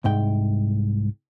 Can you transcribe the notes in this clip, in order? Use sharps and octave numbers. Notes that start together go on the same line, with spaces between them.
C2 G#2 G5